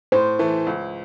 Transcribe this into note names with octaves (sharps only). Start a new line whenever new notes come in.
A2 C5
E3 A3
C#2